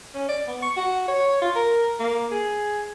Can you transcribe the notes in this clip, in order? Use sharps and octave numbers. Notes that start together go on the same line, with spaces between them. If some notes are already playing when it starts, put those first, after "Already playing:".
C#4
D5
B3
C#6
F#4
C#5
F4
A#4
A#3
G#4